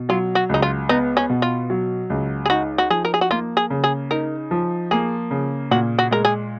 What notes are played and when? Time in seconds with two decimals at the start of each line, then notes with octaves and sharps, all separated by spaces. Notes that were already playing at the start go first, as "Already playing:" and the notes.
Already playing: B2
0.09 F#3 F4
0.35 F#4
0.49 C#2 D#4
0.62 F4
0.89 B3 D#4
1.17 C#4
1.29 B2
1.42 F4
1.70 F#3
2.10 C#2
2.46 G#4
2.50 D#4 F#4
2.78 F#4
2.90 F3 G#4
3.05 A#4
3.14 G#4
3.21 F#4
3.30 A#3 F4
3.57 G#4
3.70 C#3
3.84 G#4
4.11 D#4 A#4
4.51 F3
4.91 A#3 G#4
5.31 C#3
5.71 A#2 F#4
5.99 F#4
6.11 G#3 A#4
6.25 G#4